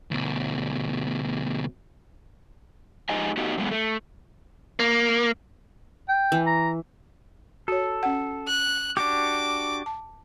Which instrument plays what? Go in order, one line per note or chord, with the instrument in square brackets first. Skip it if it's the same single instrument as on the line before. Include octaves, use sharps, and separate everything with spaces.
[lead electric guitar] D2 B2
[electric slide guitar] F3 G#3 D#4 G4 D#5 G#5
A3 B3 D#4 F#4 G4 D#5
A#2 F#3 G#3 A3 B3
A3
[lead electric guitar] A#3
[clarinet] G5
[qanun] E3
[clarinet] A#5
[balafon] F#4 C#5 [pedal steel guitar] A4
[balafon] C#4 F#5
[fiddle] F#6
[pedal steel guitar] D4 F#4 G4 [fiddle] D6
[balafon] A5